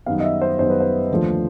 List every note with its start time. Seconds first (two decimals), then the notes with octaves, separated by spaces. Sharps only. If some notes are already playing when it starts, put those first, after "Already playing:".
0.06 F#2 D#3 G3 B3 F5
0.20 D#5
0.24 E5
0.42 C5
0.59 F#2 D#3 G3 B3 C5
0.70 B4
0.80 C5
1.11 D#2 D3 F3 A3